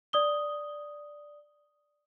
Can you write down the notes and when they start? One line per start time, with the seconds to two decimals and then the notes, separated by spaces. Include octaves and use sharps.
0.13 D5 D#6 G7